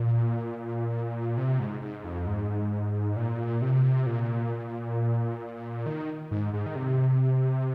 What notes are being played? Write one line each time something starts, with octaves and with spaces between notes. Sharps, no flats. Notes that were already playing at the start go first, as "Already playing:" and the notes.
Already playing: A#2
C3
G#2
G#2
F2
G#2
A#2
C3
A#2
D#3
G#2
G#2
D#3
C3